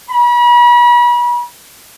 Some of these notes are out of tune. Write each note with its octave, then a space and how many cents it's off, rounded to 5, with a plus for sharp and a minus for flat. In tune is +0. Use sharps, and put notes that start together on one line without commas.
B5 -40